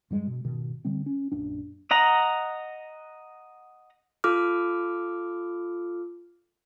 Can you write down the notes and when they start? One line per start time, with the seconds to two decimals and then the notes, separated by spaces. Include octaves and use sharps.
0.11 G2 G3 G#3
0.27 B2
0.44 G#2 B2 D#3
0.85 D3 G3 C4
1.06 C#4
1.32 A#1 F#2 D4
1.91 D#5 F#5 A#5
4.24 F4 A4 D6 F6